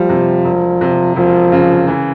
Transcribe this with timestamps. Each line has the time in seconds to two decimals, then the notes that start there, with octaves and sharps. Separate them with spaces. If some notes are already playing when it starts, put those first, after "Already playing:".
Already playing: F3 G3 A#3
0.09 C3
0.45 E1
0.81 C3
1.16 E1 F3
1.52 C#3
1.87 E3